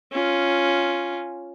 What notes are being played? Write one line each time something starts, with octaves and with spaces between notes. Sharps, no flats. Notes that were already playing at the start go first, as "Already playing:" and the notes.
C#4 F4